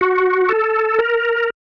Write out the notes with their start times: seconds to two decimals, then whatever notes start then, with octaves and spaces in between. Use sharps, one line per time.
0.01 F#4
0.49 A4
0.99 A#4